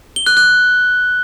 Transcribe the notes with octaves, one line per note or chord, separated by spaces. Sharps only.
G7
F#6
F#6